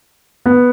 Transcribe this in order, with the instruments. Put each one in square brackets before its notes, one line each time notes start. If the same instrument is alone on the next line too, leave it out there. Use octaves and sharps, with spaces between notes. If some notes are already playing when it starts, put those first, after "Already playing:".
[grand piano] B3